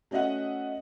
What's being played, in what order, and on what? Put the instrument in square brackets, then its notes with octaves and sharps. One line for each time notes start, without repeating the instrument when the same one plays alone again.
[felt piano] A3 C#4 F#4 D#5 E5 F#5